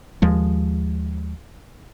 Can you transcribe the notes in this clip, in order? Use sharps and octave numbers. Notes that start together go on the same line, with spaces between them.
D#2 F3 G#3